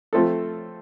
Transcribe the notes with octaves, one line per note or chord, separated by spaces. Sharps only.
F3 A3 C4 F4 A4